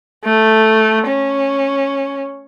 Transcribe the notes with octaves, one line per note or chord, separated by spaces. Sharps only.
A3
C#4